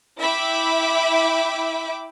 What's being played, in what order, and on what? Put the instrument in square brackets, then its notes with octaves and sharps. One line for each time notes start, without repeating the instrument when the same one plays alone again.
[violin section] E4 E5 G5 B5 D6